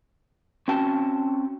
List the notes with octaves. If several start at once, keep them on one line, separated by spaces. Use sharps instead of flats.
C4 C#4 F#4 G5 A5